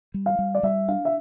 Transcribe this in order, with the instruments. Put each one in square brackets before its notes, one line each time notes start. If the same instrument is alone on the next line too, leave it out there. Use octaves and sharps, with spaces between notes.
[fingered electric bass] G3
[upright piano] F5
[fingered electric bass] G3
[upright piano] D5
[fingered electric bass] G3 [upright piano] E5
[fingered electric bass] D4 [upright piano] F5
[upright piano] E5